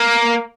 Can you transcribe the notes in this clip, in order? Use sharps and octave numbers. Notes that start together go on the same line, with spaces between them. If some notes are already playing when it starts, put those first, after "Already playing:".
Already playing: A#3